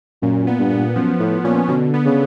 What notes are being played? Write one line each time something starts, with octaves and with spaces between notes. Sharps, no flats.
F#2 A#2
B3
G2
B3
F#2 F3
A2 F3
A#2 C#4
B2 D3
B3
C#3